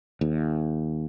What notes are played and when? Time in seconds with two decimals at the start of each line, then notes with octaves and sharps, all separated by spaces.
0.21 D#2